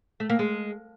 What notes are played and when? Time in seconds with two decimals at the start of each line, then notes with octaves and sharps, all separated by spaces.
0.20 A3
0.30 A#3
0.39 G#3